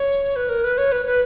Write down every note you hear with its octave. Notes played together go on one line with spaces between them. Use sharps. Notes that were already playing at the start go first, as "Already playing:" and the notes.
Already playing: C#5
B4
A#4
B4
C#5
B4
B4